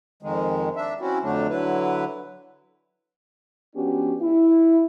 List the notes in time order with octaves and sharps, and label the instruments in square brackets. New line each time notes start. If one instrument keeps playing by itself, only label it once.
[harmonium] F2 D#3 G#3
D4 E5
F#3 C4 C#4 E4 F#4
F2 D3 F#3 A3 D4
D3 F#3 E4 B4
[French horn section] F3 B3 C#4 D4 F#4 G4
E4